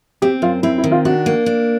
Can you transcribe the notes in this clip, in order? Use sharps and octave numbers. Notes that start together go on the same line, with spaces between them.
C4 G4
F#2 F4
C4 E4
E4
D#3
F4
D4 F#4
A#3
D4